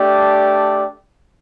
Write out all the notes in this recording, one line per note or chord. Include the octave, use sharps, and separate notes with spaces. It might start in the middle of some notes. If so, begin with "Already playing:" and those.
Already playing: A3 D4 G4 D5